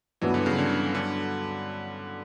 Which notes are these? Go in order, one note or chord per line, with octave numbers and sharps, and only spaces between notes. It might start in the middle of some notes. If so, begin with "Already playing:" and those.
G2 E3 F#3 B3
D3
C#3
D3
D3